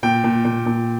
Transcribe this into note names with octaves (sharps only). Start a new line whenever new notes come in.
A#2 G5
A#2
A#2
A#2